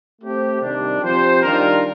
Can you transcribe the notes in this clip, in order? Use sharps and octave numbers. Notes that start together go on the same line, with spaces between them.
A3 C4 G4 C5
C3 D#3 G3 D4
F3 C4 G4 C5
D#3 G3 D4 F4 A#4